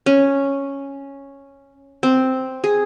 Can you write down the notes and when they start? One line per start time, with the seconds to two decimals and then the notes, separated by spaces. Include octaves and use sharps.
0.06 C#4
2.03 C4
2.64 G#4